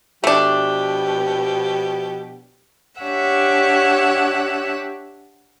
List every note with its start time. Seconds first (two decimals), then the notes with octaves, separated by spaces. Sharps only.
0.24 B2 F3 A3 D4 G4
3.01 D4 G4 C#5 E5 F#5